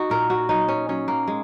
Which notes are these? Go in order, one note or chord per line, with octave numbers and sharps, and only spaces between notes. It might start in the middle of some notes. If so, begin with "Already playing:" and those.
Already playing: D#4 F#4
A#2 A#4
F#4
F#3 D#4
C#4
F#3 C#4
A#3
G#3